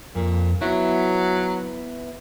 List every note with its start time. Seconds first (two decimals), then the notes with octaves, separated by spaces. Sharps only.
0.15 F2 A#2
0.62 F#3 B3 E4